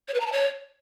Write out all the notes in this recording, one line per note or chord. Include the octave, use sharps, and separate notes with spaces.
C#5
B4
A#5
A5
C#5